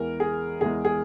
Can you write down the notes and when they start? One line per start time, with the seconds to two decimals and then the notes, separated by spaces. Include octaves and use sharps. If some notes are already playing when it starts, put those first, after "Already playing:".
Already playing: E2 E3 G#3 A#4
0.20 G#4
0.61 E2 E3 G#3 G#4
0.85 G#4